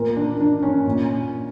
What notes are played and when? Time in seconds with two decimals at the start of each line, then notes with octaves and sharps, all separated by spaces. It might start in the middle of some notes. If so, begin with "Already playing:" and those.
Already playing: A#2 A#4
0.16 D4
0.40 D4
0.63 C#4
0.86 A#2